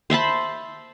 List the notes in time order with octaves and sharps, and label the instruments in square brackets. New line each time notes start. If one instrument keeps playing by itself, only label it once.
[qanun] C5 E5 A5 B5